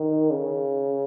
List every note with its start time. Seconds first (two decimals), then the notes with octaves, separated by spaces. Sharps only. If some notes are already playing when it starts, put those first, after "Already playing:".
Already playing: D#3
0.31 C#3